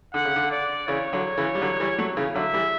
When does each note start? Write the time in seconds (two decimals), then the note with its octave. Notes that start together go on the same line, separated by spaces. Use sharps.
0.14 D3 F#5
0.25 C#3
0.36 D3
0.51 D5
0.88 C#3 E3 C#5
1.13 D3 F#3
1.38 C#3 E3
1.55 G3
1.61 D3 F#3
1.80 E3 G3
1.99 F#3 A3
2.17 C#3 E3
2.35 D3 F#3 E5
2.54 E3 G3